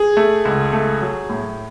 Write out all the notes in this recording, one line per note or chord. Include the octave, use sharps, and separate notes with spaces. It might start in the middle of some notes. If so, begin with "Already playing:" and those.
Already playing: G#4
A3
C#2
A3
F#3
A2